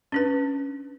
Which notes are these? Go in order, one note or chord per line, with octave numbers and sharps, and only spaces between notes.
C#4 D4 B4